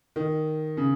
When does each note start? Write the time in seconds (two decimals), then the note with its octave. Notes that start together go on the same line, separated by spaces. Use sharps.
0.16 D#3
0.77 C#3